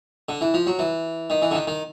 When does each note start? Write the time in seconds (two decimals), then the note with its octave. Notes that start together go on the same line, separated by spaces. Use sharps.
0.29 D3
0.41 E3
0.54 F3
0.67 F#3
0.79 E3
1.30 D#3
1.42 E3
1.51 D3
1.55 D#3
1.67 D#3